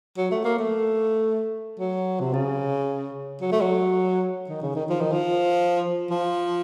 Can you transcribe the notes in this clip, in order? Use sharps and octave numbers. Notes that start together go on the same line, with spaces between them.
F#3
A3
A#3
A3
F#3
C3
C#3
F#3
A3
F#3
D#3
C#3
D#3
F3
D#3
F3
F3